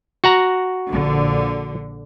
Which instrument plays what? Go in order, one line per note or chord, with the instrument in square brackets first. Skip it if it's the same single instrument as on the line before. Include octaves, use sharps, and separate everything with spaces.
[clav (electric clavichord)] F#4 F#5 A#5
[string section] A#1 D3